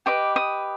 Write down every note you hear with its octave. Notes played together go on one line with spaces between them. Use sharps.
G4 B4 D#5 D6
D#6